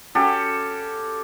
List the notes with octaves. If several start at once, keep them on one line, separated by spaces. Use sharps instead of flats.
C#4 F#4 G4 A4